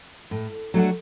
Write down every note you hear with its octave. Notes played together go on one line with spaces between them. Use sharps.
A2
F#3 A3 D4 F#4